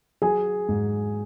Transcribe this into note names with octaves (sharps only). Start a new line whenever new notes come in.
F#3 G#4 G#5
G#2